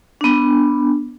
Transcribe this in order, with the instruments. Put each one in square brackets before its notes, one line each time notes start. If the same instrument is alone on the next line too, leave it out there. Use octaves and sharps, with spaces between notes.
[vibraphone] B3 D4